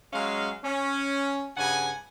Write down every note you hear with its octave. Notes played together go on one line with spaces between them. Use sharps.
F#3 G#3 C#4 F5
C#4
G2 C#3 F#5 G#5